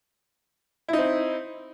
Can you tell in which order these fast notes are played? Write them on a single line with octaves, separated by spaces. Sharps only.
E4 D#4 C4